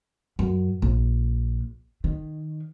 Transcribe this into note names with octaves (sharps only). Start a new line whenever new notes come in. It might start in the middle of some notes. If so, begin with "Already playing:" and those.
F#2
A#1
D#3